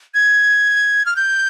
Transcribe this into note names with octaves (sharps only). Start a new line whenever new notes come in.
G#6
F6
G6